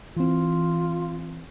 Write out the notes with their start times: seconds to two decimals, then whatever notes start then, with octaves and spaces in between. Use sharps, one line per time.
0.17 E3 C4 F4